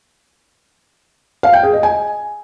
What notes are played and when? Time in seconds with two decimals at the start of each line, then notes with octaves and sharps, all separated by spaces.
1.43 F5
1.53 G5
1.63 G#4
1.73 D#5
1.83 G#5